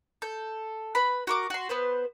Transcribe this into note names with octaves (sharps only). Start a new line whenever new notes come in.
A4 G6
B4 B5
F#4 A#4 D6
F#4 C6
B3 B4 C5